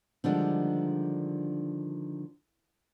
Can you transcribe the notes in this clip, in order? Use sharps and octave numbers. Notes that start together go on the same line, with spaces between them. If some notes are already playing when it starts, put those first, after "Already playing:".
D3 D#3 F3 G3 G#3 D4